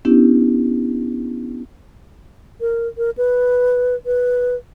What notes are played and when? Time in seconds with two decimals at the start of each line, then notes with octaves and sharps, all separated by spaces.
0.05 B3 C#4 D4 E4 G4
2.61 A#4
2.98 A#4
3.17 B4
4.06 B4